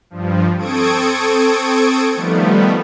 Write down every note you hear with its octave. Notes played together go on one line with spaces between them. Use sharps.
G2 F3
C4 A4 C#6 D#6 G#6 D7
D#3 F3 G3 A3 B3